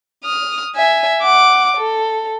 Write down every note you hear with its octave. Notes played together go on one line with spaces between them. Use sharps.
D#6 F6
E5 G#5
F#5 D6
A4